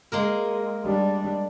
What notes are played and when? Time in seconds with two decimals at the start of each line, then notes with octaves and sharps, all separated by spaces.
0.12 G#3 A#3 A#4
0.84 G3 D4